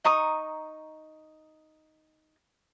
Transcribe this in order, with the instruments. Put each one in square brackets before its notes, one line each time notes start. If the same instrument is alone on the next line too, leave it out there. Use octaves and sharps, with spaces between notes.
[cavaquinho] D#4 A#5 C#6 D#6